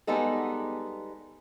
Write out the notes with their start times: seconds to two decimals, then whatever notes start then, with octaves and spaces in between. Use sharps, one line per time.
0.07 G3 G#3 B3 D#4 A4